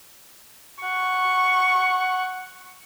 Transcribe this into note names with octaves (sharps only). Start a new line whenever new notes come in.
F#5 C#6